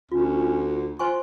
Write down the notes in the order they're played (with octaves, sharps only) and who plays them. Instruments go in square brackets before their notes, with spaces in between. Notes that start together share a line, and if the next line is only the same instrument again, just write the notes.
[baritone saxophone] D2 [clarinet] C#4 [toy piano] F4
[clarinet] F4 [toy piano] C5 G#5 C#6